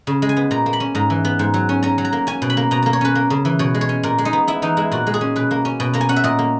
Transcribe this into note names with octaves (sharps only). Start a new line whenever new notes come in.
C#3
G#3
G#5
B3
A#2 A#5
A#3
B5
C#4
G#2 A#5
E3
B3
G#2
F#3
C#4
C#4 A#5
F#3
A#5
A#3
C#4 G#5
B2
B5
A#3
B2 A#5
A#3 A#5
C#5
C#4 B4
A#3
C#3
E3
B2 C#5
G#3
C#5
C#4
A#2 A#4
G#3
D#4
B3
B3 E4
E3 D#4
G#3 E4
A#2 F#4
G#3
G#4
C#4
B2 B4
A#3
C#4
B2
A#3 A#5
G#5
C#4 F#5
E5
A#2 D#5
A#3